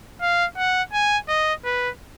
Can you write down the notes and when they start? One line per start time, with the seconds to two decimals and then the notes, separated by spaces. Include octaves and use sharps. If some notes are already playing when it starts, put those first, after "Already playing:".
0.21 F5
0.57 F#5
0.93 G#5
1.28 D#5
1.65 B4